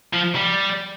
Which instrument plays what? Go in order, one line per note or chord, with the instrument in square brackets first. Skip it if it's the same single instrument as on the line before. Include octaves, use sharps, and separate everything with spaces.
[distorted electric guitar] F3
G3